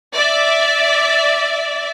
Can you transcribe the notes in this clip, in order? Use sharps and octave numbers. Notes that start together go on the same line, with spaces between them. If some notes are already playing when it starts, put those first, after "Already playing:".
D5 E5